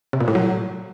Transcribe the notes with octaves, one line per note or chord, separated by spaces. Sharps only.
C3
A#2
A2
F#3